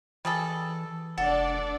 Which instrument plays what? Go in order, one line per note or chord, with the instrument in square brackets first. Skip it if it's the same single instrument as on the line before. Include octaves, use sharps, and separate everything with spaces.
[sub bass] E3 [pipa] G3 G#4 A4
[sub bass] F1 [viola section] D4 D5 [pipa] A4 [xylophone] F#5